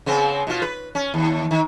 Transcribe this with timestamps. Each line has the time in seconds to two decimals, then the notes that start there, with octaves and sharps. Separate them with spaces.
0.06 C#3 B3 C4
0.47 B2 F4
0.62 B4
0.95 C#4
1.14 D#2
1.51 D#3